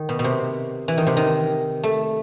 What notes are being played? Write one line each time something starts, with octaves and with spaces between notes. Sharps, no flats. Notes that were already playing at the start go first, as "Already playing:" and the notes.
Already playing: D#3
B2
B2
C3
E3
D#3
C3
D#3
A3